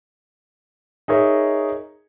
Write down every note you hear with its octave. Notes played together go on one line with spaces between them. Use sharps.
D#4 G#4 A#4 C#5 E5